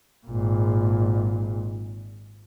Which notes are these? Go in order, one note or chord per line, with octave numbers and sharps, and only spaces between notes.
G#1 A#2